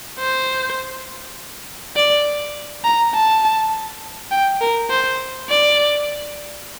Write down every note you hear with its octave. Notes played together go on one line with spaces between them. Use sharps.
C5
D5
A#5
A5
G5
A#4
C5
D5